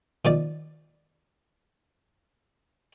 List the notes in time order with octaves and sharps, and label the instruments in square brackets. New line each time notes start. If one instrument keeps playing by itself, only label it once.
[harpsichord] D#3 F3 D5